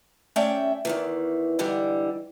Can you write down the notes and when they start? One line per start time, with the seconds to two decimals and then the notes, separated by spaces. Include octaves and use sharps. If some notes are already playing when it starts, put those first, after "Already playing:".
0.36 A3 C#4 D5 E5 G5
0.85 E2 D#3 E3
1.59 G#2 D3 E3 G3